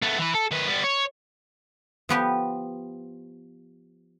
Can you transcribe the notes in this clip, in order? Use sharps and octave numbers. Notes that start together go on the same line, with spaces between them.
A3 B3
E3 B4
A4
D#3 B4
G3 B3
C#5
F3 B3 G4